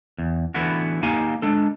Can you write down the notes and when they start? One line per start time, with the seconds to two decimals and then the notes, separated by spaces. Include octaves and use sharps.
0.18 E2
0.54 D3 E3 A3 B3 E4 F#4
1.03 A#3 D#4 G4 F5 G#5
1.42 G#3 D4 A4